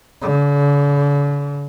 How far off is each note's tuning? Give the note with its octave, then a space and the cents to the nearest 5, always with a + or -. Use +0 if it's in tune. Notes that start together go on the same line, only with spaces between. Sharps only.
D3 -45